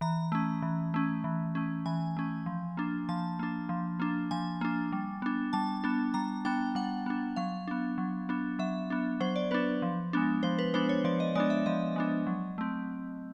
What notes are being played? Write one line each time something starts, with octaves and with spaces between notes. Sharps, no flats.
E3 A#5
A3 C#4
E3
A3 C#4
E3
A3 C#4
E3 G#5
A3 C#4
F3
A#3 D4
F3 A5
A#3 D4
F3
A#3 D4
F3 G#5
A#3 D4
G3
B3 D4
G3 A5
B3 D4
G3 A#5
B3 D4 G5
G3 F#5
B3 D4
F#3 F5
B3 D4
F#3
B3 D4
F#3 E5
B3 D4
F#3 C5
D5
B3 D4 B4
F3
G#3 B3 D4
F3 C5
B4
G#3 B3 D4 C5
C#5
F3 D5
D#5
G#3 B3 D4 D5
E5
F3 D#5
G#3 B3 D4
F#3
A3 C4